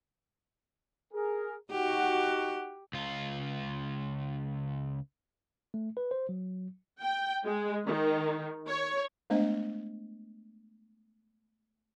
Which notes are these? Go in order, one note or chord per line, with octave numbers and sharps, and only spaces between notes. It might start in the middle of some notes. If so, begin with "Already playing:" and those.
G#4 A#4
D#4 F#4 G4 F#5
C#2 F4
A3
B4
C5
F#3
G5
G#3
D#3
C#5
G#3 A3 B3 D4 C5 D#5